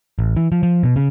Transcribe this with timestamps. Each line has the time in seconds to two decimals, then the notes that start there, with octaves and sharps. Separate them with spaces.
0.19 A1
0.37 E3
0.52 F3
0.63 F3
0.83 B2
0.96 C#3